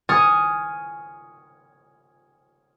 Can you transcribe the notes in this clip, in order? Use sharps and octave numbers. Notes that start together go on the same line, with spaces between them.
G#5 C#6 D#6 F6 G#6 A6